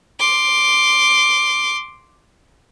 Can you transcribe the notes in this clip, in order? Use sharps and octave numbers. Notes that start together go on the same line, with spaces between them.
C6 D6